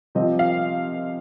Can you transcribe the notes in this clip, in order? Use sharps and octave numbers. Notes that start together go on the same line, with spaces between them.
C3 F3 C4 D#5
F5